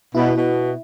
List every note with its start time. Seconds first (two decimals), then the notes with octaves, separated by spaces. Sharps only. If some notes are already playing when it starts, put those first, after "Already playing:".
0.14 B2 E4
0.35 B2